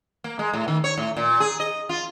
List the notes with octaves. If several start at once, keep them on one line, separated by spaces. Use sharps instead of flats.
A#3
G#3
A2
D#3
C#5
A2
A#2
G#4
D#5
F4